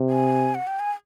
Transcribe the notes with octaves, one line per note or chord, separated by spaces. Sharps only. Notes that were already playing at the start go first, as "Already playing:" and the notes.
Already playing: C3
G#5
F#5
G5
G#5